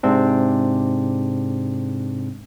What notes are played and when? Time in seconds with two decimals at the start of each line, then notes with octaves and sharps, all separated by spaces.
0.03 G#2 C3 C4 D4